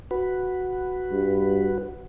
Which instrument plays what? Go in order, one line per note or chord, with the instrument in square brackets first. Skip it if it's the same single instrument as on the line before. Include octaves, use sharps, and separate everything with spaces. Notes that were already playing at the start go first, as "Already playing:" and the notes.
[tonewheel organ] F#4 B4
[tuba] G2